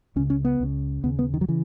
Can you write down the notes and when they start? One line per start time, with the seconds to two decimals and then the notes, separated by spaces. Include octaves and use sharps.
0.16 C#2 C#4
0.19 C#3
0.30 C#4
0.45 B3
0.60 C#2 C#3
1.04 D#2 C#3 B3
1.19 B3
1.34 D#3
1.41 F#3
1.48 C#3 E3